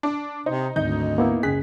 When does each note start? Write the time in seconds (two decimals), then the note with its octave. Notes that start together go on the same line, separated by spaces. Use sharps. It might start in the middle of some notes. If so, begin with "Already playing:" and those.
0.03 D4
0.46 C3 D#4 C5
0.76 G#1 D2 D#4 G6
1.18 A#3 B3 E4
1.43 F#1 C#2 G#4 F#6 B6